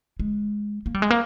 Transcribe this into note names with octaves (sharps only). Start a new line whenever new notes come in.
G#3
A#3
G3
G#3
A#3